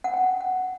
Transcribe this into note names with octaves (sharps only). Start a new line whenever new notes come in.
F#5
G5
F#5